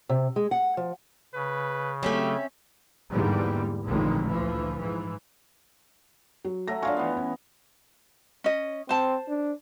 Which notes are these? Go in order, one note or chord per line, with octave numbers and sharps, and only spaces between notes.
C3
G#3
F#5
F3
C#3 B4
F#3 A3 C4 C#4 G4 E5
E2 G#2 D3 E3 G3 A#3
A1 F2 A#2 D3 D#3 G#3
D2 E3 F3
G#2 E3
F#3
F#3 A3 A#6
D4 F4 F5 G#5 C#6
E3 B3
C#4
C#4 D#5
C4 C5 A5
D4